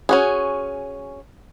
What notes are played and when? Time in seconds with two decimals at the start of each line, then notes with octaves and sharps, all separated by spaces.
0.09 C#4 F#4 G#4